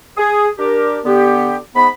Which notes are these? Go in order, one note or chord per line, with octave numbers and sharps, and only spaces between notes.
G#4
D4 G4 A#4
D3 B3 G4
G#2 B3 B5